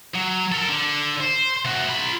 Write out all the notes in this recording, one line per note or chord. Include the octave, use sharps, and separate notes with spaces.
F#3
A4 A#4
D3
C5
C3 F#4
F4 B5